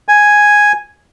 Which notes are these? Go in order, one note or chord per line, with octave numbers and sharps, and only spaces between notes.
G#5